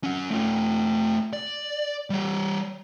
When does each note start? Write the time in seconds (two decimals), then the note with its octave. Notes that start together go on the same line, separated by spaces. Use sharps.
0.04 C#4 F#5
0.31 A3 F4
1.33 D5
2.10 G3 C#5